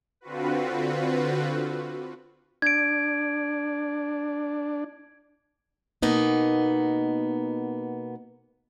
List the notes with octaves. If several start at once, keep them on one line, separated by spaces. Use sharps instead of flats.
D3 C4 F4 F#4 B4
D4 G#6 D7
B2 A#3 B3 D#4